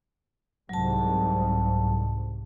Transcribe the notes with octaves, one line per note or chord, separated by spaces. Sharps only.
C2 G#2 F#3 A5